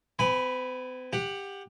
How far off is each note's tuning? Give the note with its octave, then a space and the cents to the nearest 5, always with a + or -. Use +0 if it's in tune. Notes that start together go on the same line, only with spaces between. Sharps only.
C4 -45 G#5 -15 B5 +0
G4 +15 F#5 +0